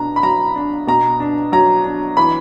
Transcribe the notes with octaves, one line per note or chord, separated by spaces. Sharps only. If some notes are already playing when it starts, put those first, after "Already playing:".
Already playing: B2 D4 A#5
B5
F#3 A#5
D4
B2 A#5
D4
F#3 A#5
D4
E3 B5